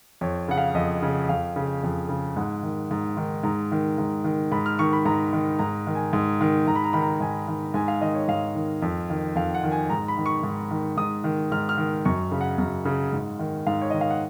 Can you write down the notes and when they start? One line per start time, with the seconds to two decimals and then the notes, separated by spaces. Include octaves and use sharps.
0.21 F2 C#5
0.48 C#3 F#5
0.57 F5
0.74 F2 D#5
1.03 C#3
1.29 F2 F5
1.56 C#3
1.83 F2
2.09 C#3
2.36 G#2 F#5
2.63 D#3
2.91 G#2
3.17 D#3
3.44 G#2 A#5
3.72 D#3
3.98 G#2
4.24 D#3
4.52 G#2 B5
4.66 F6
4.79 D#3 C#6
4.93 B5
5.05 G#2 A#5
5.33 D#3
5.59 G#2 A#5
5.87 D#3
5.95 G#5
6.13 G#2
6.41 D#3
6.67 G#2 A#5
6.76 B5
6.84 A#5
6.93 D#3 B5
7.01 A#5
7.20 G#2 G#5
7.48 D#3
7.74 G#2 G#5
7.88 F5
8.01 D#3 D#5
8.15 C#5
8.28 G#2 F5
8.55 D#3
8.82 F2
9.10 D#3
9.35 F2 F5
9.54 F#5
9.63 D#3
9.71 G#5
9.89 G#2 A#5
10.08 B5
10.17 D#3
10.26 C#6
10.43 G#2
10.71 D#3
10.97 G#2 D#6
11.24 D#3
11.52 G#2 F6
11.69 F6
11.78 D#3
12.05 F#2 C#6
12.31 C#3
12.41 F#5
12.58 F#2
12.85 C#3
13.13 G#2
13.39 D#3
13.67 G#2 F5
13.82 C#5
13.90 D#3 D#5
14.01 F5
14.10 F#5